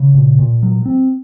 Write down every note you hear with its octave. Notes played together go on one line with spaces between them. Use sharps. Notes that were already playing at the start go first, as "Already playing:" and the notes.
Already playing: C#3
A#2
A#2
F#3
C4